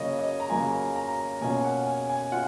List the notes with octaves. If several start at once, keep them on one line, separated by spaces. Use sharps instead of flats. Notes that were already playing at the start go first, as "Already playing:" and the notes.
Already playing: C#3 F#3 A#3 F4 C#5 D#5
D#5
A#5
C#3 F#3 A#3 F4 G#5
A#5
B2 A#3 C#4 F4 G#5
F#5
G#5
G#5
F4 F#5